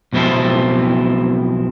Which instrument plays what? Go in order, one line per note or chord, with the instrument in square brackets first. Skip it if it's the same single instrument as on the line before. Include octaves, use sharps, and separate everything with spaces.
[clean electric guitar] B1 F2 B2 C4 E4 A4